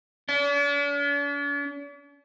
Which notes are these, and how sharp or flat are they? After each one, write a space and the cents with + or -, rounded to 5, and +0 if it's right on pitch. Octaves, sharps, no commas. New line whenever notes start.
D4 -45